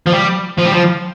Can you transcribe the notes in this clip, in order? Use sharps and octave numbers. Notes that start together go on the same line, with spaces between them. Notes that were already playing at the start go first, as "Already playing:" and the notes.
F3
G3
F3
G3
F3